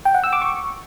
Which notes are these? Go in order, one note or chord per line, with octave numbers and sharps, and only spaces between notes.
G5
F#5
E6
D6
C#6